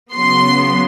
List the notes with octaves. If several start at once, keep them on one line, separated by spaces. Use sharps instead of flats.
C#3 F#3 B3 C6